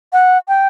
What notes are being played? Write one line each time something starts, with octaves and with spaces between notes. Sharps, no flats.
F#5
G5